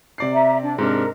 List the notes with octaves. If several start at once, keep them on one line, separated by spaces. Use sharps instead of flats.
C3 D5 C7
E5 A#5
D4
G#2 C3 D4 A#4